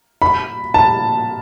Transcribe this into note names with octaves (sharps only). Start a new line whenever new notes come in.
B5
A5